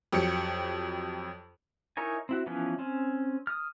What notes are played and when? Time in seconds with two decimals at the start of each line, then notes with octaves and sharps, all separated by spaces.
0.12 F2 F#3 G4 C#7
1.97 D#4 E4 A#4 C#5 G#5
2.29 C4 E4 F#4
2.47 E3 F3 B3 C#4
2.79 C4 C#4
3.47 D#6 F6